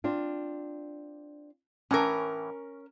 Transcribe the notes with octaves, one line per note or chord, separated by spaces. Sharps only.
C4 D4 F4
A2 E3 C#4 A#4 G#5